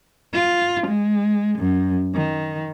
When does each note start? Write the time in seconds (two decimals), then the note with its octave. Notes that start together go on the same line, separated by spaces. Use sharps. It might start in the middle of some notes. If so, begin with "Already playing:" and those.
0.34 F4
0.87 G#3
1.59 F#2
2.13 D#3